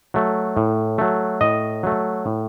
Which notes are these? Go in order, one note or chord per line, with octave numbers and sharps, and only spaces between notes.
F#3 A3
A2
F#3 A3
A2 D#5
F#3 A3
A2